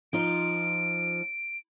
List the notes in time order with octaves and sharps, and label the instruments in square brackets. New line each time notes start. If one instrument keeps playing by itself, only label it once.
[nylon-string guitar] F3 D#4 F4 [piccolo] D7